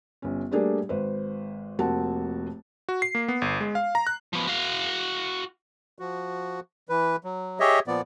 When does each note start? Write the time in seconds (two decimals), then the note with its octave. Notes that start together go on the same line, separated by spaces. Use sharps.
0.22 G1 C#4
0.51 G3 A3 A#3 D4 G4 G#4
0.89 G#1 B4 C5
1.79 F1 A#3 C4 F#4 A5
2.89 F#4
3.02 C7
3.15 A#3
3.28 B3
3.42 G1
3.61 G#3
3.75 F5
3.95 A#5
4.07 F#6
4.33 F3 B3
4.47 F#4 F5
5.99 F3 F#4
6.89 E3 B4
7.24 F#3
7.60 G4 G#4 C#5 D#5 E5
7.87 A#2 F3 B3 D5